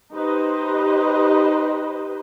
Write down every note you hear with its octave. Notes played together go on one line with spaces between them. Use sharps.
D#4 G4 B4 C5 D#5